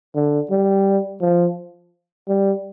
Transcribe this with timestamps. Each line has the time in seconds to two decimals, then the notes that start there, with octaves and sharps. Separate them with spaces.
0.15 D3
0.50 G3
1.21 F3
2.28 G3